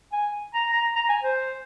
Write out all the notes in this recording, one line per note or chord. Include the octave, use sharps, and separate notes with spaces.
G#5
A#5
A#5
A#5
G#5
C5